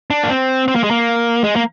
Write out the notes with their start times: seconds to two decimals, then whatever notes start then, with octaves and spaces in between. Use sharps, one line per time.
0.10 D4
0.23 A#3
0.30 C4
0.68 C4
0.76 A#3
0.84 G#3
0.91 A#3
1.44 G#3
1.56 A#3